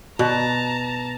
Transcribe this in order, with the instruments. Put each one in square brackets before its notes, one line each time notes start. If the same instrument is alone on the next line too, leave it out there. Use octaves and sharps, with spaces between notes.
[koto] B2 [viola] A5 A#5